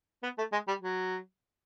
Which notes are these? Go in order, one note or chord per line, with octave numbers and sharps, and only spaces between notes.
B3
A3
G#3
G3
F#3